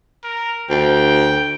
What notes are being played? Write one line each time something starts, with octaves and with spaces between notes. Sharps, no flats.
A#4
D2 G5